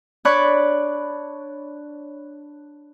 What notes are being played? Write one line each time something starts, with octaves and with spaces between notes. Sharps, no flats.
D4 C#5 D5 B5 C#6 F#6